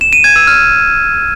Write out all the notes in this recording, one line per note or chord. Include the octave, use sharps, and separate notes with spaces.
E7
D#7
G#6
E6
F6